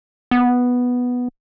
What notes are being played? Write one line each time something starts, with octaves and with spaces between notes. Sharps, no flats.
B3